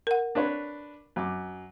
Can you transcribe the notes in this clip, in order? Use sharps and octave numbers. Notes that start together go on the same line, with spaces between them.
A#4 F#5
D4 B4 C#5
F#2 D6